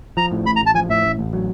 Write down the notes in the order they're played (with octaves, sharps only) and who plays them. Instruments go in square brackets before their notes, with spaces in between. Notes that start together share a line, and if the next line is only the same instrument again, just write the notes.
[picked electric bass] F3 [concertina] A#5
[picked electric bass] A2
[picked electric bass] A1 [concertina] B5
[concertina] A#5
[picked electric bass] A1 [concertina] A5
[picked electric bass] F3 [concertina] G#5
[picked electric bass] A2 [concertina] E5
[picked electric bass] A1
A1
F#3